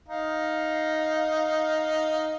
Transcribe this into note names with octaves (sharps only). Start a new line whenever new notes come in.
D#4 F5